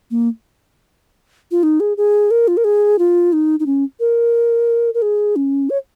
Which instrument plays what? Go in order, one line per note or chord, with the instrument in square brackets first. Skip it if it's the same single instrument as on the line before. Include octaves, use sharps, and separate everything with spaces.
[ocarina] A#3
F4
D#4
G#4
G#4
A#4
F4
A#4
G#4
F4
D#4
D#4
C#4
A#4
A#4
G#4
C#4
C#5